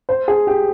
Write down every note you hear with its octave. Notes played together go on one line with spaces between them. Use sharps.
C5
G#4
G4